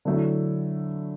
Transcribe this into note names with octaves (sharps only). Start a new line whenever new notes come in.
D3 F#3 A3 E4